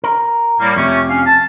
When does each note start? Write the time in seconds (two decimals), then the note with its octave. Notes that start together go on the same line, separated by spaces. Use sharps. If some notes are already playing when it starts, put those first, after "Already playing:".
0.04 A#4
0.60 A2 G3 A#3
0.76 F2 C3 A3 C#4 G4
1.09 C#4 F5
1.26 A5